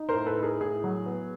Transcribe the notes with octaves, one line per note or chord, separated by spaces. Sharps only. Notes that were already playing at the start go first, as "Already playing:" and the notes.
Already playing: D#4
A#4 C5
A2
A4 B4
D#4
G#4 A#4
A2 G#4
F#3
B3